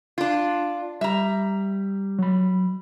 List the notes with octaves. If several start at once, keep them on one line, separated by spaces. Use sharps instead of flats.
D4 F4
G3 E5 A#5
F#3 B5